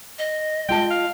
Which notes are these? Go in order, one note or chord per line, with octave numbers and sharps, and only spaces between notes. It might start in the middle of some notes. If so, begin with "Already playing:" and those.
D#5
G#3 F4 G5 A5
F5